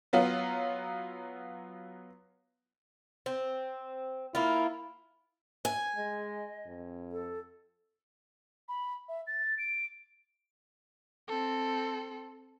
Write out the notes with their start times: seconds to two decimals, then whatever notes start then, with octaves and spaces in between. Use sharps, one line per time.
0.13 F#3 B3 F4
3.26 C4
4.35 A#3 E4 F4
5.65 G#5
5.96 G#3 D#5
6.66 F2
7.12 A4
8.69 B5
9.09 E5
9.27 A6
9.58 D7
11.28 C4 A4